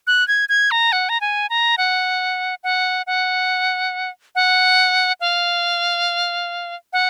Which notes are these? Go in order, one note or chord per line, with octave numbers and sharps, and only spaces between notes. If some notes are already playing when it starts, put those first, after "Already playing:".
F#6
G#6
G#6
A#5
F#5
A#5
G#5
A#5
F#5
F#5
F#5
F#5
F5
F#5